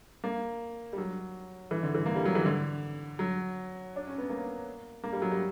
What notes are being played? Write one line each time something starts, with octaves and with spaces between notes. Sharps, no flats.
A#3
G3
F#3
E3
D3
E3
A#3
G3
F#3
E3
D3
F#3
D4
C#4
B3
A#3
A#3
G3
F#3
G3